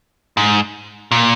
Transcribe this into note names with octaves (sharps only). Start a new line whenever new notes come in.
G#2
A#2